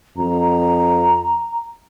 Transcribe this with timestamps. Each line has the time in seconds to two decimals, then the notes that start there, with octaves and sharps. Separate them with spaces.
0.17 F2 A#5